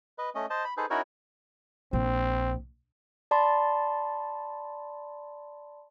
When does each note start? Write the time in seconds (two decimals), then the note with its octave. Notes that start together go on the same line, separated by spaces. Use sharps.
0.18 B4 D#5
0.35 A3 C#4 D#5
0.50 C5 D#5 A5
0.64 B5
0.77 D#4 G#4 A4 B4 C5
0.90 C#4 D#4 E4 F#4 A#4 C#5
1.93 A#1 C4
3.31 D5 A5 B5 C6